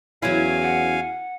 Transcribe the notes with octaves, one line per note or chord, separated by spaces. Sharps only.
E2 F#3 C#4 E4 F5 G#5
F#5